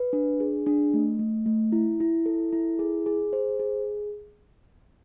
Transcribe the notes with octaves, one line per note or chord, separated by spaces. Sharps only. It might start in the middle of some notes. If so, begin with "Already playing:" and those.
Already playing: B4
D4
G#4
D4
A3
A3
A3
E4
E4
A4
E4
G#4
G#4
C5
G#4